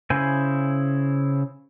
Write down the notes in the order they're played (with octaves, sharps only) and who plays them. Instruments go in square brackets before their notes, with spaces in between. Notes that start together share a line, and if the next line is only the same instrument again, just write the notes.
[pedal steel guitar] C#3 E4 C5 G#5